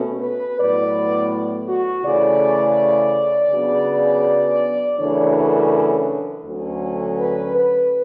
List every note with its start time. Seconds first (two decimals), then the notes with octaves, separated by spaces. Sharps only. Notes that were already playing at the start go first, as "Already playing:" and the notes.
Already playing: B2 A3 C#4
0.21 B4
0.57 A2 F#3 B3 D5
1.68 F#4
2.04 C#3 E3 A3 C#4 D5
3.51 C#3 F#3 B3 D4
4.97 F#2 C#3 E3 A3 D4 C#5
6.44 D2 D3 F#3 C#4
7.17 B4
7.54 B4